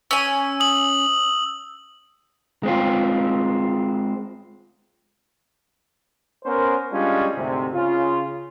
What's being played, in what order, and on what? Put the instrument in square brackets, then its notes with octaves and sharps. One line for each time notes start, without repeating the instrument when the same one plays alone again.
[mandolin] C#4 G#5 [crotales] E6
[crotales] D#6 F#7
[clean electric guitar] G#3 C4 F4
[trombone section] B3 C#4 A#4 C5
G3 G#3 C#4 D4 F4
D2 G#2 C3
C#3 F4